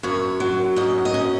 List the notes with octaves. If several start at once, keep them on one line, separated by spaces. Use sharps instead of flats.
F#2 C#5
F#3
F#2 D#5
D#5
C#4